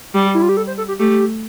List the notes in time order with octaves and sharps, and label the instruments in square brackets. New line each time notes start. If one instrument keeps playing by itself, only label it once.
[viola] G3 [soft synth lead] G4
[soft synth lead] E4
F4
G4
A4
C5
A4
G4
[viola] A3 [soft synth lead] G4